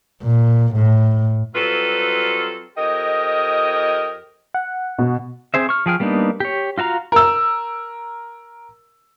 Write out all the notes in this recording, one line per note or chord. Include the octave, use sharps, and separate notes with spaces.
A#2
A2
F#3 G3 C4 F4 A4 B4
F2 G4 A#4 D#5
F#5
B2
C4 G#4 C5 E5
C#6 F6
F3 G#4 G5 F6
G3 A#3 B3 D4 D#4
G4 C#5
F4 F#4 F5 A#5
A#4 E6